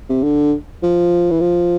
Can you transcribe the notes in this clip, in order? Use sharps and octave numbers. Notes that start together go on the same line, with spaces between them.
C3
D3
F3
E3
F3